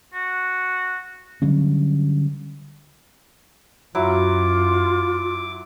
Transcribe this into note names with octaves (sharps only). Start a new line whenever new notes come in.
F#4
D3 F#3 G3 C#4
F#2 F#3 E4 F4 D6